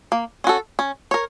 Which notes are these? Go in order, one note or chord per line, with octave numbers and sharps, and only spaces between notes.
A#3
C#4 F#4 A4
C#4
A#4 C#5